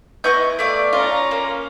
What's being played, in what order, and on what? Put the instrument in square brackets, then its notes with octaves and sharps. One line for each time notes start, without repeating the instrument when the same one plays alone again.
[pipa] B3 E4 [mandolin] D#5 C#6 G6
[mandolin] A3 D5 F5
[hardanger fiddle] C#4 A#5 [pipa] F4
[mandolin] A#3